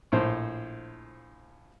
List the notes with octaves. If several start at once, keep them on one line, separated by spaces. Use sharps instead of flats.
A#1 A2 C5